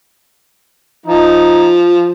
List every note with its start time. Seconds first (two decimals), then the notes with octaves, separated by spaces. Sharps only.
1.07 F3 D#4